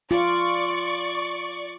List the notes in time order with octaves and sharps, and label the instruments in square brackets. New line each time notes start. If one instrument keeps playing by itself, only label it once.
[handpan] F4 [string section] D5 C#6